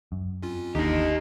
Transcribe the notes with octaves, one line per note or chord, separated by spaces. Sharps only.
F#2
F2 C#4 F4
G1 D#2 D3 D4 D#4 G4 D#5